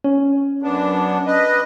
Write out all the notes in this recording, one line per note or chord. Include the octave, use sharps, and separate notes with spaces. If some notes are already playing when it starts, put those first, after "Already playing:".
C#4
F#2 B3 D4
B4 D#5